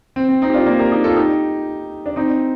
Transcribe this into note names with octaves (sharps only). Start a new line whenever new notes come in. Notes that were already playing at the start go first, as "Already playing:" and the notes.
C4
C4
C4 D#4
G4
D4 F4
A#3 D4
G4 A#4
D#4 G4
F4 A4
D#4 G4
D4
C4 D#4